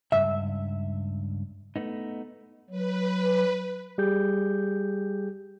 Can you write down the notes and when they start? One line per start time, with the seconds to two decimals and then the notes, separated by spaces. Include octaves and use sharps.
0.12 C#2 G2 E5
1.76 A3 B3 D#4
2.70 F#3 B4
3.98 G3 G4 G#4 G6